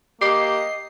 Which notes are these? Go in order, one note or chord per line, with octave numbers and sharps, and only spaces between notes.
A#3 G4 D#5 C7